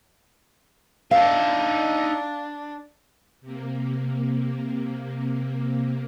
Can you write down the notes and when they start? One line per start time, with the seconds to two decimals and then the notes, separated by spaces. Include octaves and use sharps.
1.11 D4 D#4 E5 F5
3.41 C3 A#3